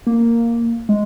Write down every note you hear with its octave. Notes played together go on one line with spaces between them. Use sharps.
A#3
G#3